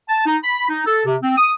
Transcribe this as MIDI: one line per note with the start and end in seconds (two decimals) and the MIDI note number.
0.09 0.23 81
0.26 0.37 63
0.44 0.66 83
0.69 0.83 63
0.86 1.02 69
1.05 1.16 48
1.23 1.36 60
1.38 1.52 87